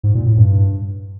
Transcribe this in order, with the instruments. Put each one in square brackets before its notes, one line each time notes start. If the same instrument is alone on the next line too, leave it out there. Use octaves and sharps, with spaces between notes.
[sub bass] G#2
A#2
A2
G2